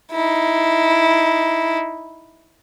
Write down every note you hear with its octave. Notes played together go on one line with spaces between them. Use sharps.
D#4 E4